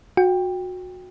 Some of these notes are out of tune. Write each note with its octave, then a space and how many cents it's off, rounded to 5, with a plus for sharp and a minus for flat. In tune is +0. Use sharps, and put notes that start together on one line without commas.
F#4 -20 G5 +15